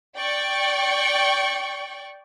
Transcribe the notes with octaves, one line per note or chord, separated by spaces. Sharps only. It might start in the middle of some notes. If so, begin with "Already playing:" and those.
D5 G5 C#6